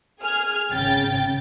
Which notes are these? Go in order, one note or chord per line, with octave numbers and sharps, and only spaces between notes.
G#4 G#5 F6 G#6
G#1 C#3 G5 A6